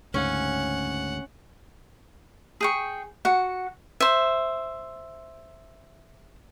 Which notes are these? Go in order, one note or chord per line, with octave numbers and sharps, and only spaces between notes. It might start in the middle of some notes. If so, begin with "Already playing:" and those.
D2 G#2 C#3 C#4 F#5
G#4 G5 C#6
F#4 F#5
C5 E5